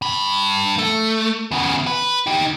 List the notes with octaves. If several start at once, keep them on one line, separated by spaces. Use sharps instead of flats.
G2 B5
A3
E2 C#3
B4
D#4 G4